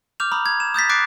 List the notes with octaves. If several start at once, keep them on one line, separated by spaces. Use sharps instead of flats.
D6 F6 G6 F7
A#5 B5 D#6
G#6
E7
D#6 G6 A6 B6
D6 F#6 A6 C7 D7